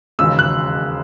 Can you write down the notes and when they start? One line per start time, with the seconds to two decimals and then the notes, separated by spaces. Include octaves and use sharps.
0.19 E1 D#2 C#3 G#3 E6
0.39 F#6